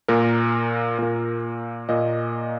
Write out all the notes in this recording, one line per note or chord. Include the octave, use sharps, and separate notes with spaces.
A#2 A#3 A#4
A#2 A#3
A#2 A#3 D#5